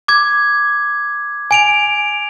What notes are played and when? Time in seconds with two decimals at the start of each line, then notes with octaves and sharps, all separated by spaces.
0.08 D6 G#6
1.51 G#5 D7 F7